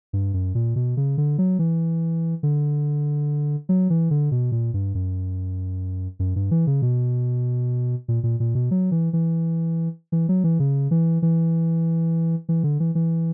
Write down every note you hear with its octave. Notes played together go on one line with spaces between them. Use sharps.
G2
F#2
A#2
B2
C#3
D3
F#3
E3
D3
F#3
E3
D3
B2
A#2
G2
F#2
F#2
G2
E3
C#3
B2
A#2
A#2
A#2
B2
F#3
E3
E3
E3
F#3
E3
C#3
E3
E3
E3
D3
E3
E3